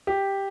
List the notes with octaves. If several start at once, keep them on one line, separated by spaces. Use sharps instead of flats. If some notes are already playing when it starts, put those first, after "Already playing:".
G4